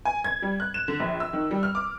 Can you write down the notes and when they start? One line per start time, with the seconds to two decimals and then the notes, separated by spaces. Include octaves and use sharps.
0.05 G#5
0.24 G#6
0.42 G3
0.60 F#6
0.74 E7
0.88 D3
1.00 A#1
1.20 E6
1.33 D#3
1.51 G3
1.63 F6
1.75 D6